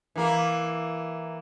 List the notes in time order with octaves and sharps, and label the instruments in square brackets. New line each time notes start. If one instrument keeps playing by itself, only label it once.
[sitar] E3 A#3